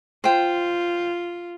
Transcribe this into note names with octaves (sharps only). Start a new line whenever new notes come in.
F4 C5 G5